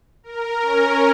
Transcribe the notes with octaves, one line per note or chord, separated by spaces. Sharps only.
A#4
C#4